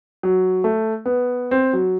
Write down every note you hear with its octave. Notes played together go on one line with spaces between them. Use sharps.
F#3
A3
B3
C4
F#3